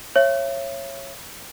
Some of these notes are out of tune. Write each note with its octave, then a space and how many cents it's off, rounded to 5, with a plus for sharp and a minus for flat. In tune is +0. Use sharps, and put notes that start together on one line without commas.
C#5 -20 E5 +35